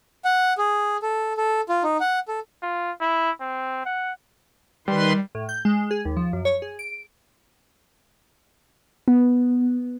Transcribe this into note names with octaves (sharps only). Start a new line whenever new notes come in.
F#5
G#4
A4
A4
F4
D#4
F#5
A4
F4
E4
C4
F#5
D#3 G3 B4 C6
A2
G6
G#3
G#4
D#2
F3
F#2
C#5
G#4
D7
B3